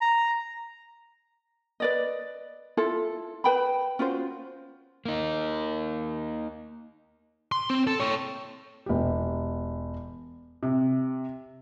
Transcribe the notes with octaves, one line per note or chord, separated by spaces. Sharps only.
A#5
B4 D5 D#5
E4 F4 A4
B4 G5 B5
C#4 F4 F#4 C5
A#3 D#4
C6
C4
A4
C#5 G5
E1 G4
C3